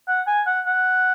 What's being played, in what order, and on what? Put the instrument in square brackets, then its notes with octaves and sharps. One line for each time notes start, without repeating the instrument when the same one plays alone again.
[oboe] F#5
G#5
F#5
F#5